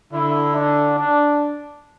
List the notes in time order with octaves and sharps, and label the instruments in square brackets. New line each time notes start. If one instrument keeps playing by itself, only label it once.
[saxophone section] D3 [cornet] E4
[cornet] D4
D4